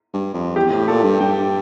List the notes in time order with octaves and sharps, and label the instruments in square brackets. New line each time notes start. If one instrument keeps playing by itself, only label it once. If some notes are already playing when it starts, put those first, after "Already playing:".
[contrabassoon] G2
F2
[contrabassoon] E2 [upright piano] G4
[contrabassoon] A2
[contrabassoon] A#2 [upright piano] A4
[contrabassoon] G2
[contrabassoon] G2 [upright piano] G5